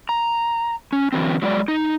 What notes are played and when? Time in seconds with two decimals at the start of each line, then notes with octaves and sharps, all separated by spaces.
0.09 A#5
0.92 C#4
1.12 D3 E3 F#3 C4
1.42 F#3 G#3 F#4 D5
1.68 D#4